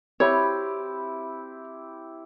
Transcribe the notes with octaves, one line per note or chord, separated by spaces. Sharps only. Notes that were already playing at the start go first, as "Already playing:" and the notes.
C4 E4 G4 C#5